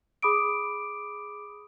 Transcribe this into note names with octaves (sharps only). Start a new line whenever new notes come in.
G#4 B5 D6 D#6 D7